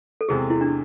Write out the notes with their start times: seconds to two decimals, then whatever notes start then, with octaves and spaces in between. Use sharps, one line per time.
0.21 A4
0.29 E2 C3 G#3 C4 G#4
0.50 E4
0.61 D4